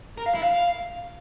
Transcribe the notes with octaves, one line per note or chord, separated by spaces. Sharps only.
A#4
F5
E4
F5